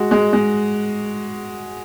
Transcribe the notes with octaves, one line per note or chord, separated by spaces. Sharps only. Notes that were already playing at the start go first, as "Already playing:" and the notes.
Already playing: G#3 F#4
G#3
G#3